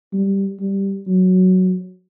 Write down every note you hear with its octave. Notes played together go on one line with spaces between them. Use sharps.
G3
G3
F#3